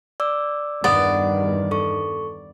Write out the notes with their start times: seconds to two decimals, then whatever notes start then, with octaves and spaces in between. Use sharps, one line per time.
0.20 D5 D6 E6
0.84 E2 G2 D#3 B3 D5 F#5
1.71 A4 C#6